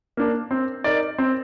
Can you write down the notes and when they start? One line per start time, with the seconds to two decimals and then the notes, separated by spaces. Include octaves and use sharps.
0.17 A#3 D4
0.51 C4
0.84 D#4 A#4 D5
1.18 C4